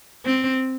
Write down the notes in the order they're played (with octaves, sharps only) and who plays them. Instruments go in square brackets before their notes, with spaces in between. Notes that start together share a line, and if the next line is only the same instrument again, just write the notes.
[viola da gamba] C4